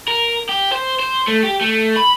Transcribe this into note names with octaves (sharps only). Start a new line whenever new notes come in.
A#4
G4
C5
C5
A3
G4
A3
B5